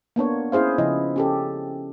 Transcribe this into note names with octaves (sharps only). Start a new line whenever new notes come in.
A#3 B3 D4 C#5
C#4 E4 G#4 C5 F5
C#3 F3 E4 D#5
C#4 G4 A4